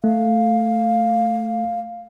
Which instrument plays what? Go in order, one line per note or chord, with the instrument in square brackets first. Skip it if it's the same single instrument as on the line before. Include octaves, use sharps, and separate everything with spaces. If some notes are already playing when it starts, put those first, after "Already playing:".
[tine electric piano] A3 [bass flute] F5